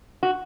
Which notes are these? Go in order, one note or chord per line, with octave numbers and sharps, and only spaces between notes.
F#4